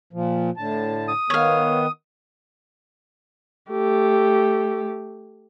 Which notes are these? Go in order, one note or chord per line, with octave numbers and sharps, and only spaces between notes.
A#2 F3
A2 D3 A5
D#6
D#3 B3 C#5 F5
A3 G4